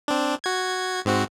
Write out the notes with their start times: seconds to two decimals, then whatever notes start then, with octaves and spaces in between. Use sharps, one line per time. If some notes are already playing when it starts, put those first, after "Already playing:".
0.08 C4 D4
0.44 F#4 G#6
1.05 G#2 C4 F#4